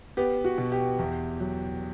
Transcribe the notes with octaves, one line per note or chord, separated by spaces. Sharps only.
B3 G4
F#4
B2
G4
E2
F#3